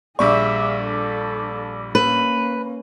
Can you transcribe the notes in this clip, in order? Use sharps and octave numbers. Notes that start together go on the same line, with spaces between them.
A#1 G3 G#4 D5 E5 C#6 D6
D4 A4
A#3 C#4 B4